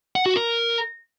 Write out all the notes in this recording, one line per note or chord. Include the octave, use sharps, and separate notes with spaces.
F#5
F#4
A#4